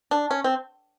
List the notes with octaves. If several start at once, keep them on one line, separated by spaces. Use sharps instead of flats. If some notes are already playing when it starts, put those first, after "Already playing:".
D4
C#4
C4